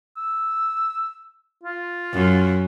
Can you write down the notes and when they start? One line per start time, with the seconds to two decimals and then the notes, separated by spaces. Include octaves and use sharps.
0.17 E6
1.64 F4
2.13 F#2